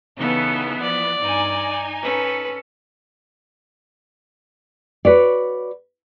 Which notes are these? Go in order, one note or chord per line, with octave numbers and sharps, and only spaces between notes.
C#3 E3 B3 D#4 A4
F3 D5
G2 D#4 G#5
C#4 A4 B4
F#4 B4 C#5 D5